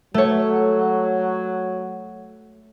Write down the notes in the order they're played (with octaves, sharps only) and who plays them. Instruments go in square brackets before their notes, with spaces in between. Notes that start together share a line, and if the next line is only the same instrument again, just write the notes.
[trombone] F#3 [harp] A3 C#5